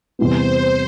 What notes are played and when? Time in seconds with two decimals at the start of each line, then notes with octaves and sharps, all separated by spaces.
0.19 E2 C3 G3 B3 C5